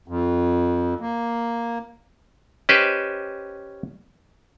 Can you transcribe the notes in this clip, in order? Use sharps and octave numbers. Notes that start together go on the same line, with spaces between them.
F2
A#3
C#4 G4 B4 C5 D#5